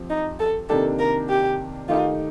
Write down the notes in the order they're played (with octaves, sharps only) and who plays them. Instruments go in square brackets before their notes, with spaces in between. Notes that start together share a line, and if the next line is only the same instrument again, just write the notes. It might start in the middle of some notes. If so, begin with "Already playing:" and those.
Already playing: [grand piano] F3 C4 G4
[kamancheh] D#4
A4
[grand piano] C3 D#3 A#3 D4 G4 [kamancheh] A4
[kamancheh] A#4
G4
[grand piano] D#3 A3 D#4 G4 [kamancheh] F4